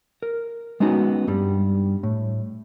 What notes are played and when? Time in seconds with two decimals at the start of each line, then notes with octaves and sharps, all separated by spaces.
0.23 A#4
0.80 G#3 B3 C#4 D#4 F#4
1.27 G2 G3
2.03 A2